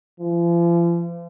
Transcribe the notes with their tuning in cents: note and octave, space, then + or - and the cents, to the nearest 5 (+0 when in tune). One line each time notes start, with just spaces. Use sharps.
F3 -40